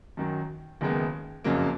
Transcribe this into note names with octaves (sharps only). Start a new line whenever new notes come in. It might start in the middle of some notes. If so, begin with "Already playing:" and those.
F#2 D#3 F#3
F#1 F#2 D#3 G#3 B3
F#1 F2 C#3 F#3 A#3